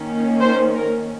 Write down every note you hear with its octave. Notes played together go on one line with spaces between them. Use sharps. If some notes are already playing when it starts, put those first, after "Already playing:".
Already playing: D#3 A#3 C#4
C5
A#4